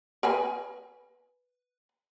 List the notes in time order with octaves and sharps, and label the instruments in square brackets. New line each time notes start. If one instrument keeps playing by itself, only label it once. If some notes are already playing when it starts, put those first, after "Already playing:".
[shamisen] A#4 B4 G#5